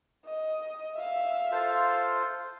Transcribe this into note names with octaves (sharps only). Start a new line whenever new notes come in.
D#5
E5 F5
F4 A4 C5